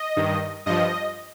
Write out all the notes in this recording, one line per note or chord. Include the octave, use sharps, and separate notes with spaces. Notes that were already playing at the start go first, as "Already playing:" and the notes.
Already playing: D#5
G2 D#3
G2 F3 D#5